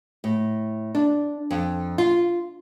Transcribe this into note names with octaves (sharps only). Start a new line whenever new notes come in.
A2
D4
F2
F4